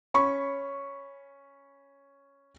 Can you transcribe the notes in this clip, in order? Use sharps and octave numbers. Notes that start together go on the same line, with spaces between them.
C#4 B5 C#6